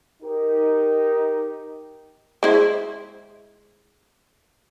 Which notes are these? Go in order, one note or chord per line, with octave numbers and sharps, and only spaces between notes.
D#4 G4 A#4
G#3 E4 C5